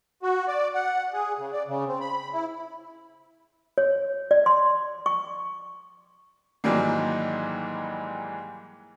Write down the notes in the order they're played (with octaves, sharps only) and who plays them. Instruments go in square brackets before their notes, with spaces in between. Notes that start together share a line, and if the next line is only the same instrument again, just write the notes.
[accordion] F#4
D5
F#5
G#4
C#3
D5
C#3
C4
B5
E4
[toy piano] C#5
D5
C6
C#6
[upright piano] G#2 D#3 E3 F#3 G3 A#3